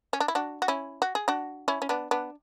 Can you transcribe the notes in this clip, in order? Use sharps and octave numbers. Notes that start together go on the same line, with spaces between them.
C#4
D4
E4
D4 F#4
F#4
C#4 E4
F#4
G#4
D4 F#4
C#4 E4
C#4
B3 D4
B3 D4